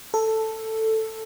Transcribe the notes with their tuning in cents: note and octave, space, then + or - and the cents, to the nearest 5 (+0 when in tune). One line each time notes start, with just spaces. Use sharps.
A4 +5